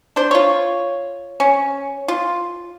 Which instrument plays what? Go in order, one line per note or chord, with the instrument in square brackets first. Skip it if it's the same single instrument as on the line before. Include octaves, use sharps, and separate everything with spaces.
[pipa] D4 C5
F4 C#5
C#4
F4